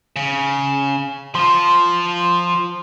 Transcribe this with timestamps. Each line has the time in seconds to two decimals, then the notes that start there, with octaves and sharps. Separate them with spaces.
0.16 C#3
1.35 F3 F4 C6